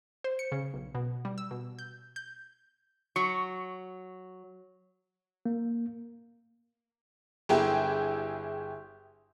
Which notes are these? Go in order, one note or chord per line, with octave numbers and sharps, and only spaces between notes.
C5
C#7
C#3
B1
B2
G3
E6
B2
G6
G6
F#3 C#6
A#3
G1 E4 G4 G#4 G5